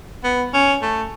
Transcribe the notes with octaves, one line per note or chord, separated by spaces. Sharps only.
B3
C#4
A3